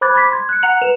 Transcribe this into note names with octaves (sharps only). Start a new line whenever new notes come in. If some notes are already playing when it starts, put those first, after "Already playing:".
C5 B5 D6 F#6 G#6 A6
B5 D6 A6 B6
C6 G#6
F#6 C#7
F#5 A#5 F#6 C#7 F7 F#7
B4 E7 F7